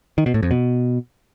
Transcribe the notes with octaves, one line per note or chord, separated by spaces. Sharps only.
D#3
B2
A2
F2
B2